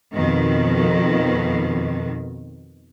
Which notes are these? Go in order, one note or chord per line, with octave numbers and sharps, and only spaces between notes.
F2 B2 D#3